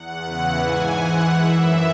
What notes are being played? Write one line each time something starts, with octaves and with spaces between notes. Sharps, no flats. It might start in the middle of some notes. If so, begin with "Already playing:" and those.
Already playing: E2 F#5
E2 C#3 E3 F#5
G#2 E3 G#5
G#2 E3 F#5
F#2 E3 E5